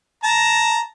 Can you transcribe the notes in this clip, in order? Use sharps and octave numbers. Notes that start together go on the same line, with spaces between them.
A5 A#5